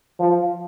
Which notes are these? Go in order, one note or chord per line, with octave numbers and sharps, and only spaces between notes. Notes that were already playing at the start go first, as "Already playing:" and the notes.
F3